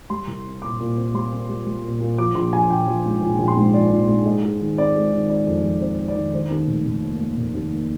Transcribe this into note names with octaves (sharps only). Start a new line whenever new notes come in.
G3 C6
C2
C4
A#2 D6
A#2
C4
G3 C6
C4
G3
G3
A#2
A#2
F3 D6
A#1 C6
F3 G#5
A#1 G5
F3
G#2
A#1
A#1
C6
G#2
F3 D5
A#1
G#2
G#3 D#5
G#3
D#3
C4 D5
G#3
D#3
C4 D5
F2
F2
C4 C5
C4
D5
D#3
D#3 C5
D#2
F1
F1
A#3
A#3
F1
D#2
A#3